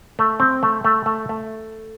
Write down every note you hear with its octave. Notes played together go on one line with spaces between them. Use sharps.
A3
C4
A3
A3
A3
A3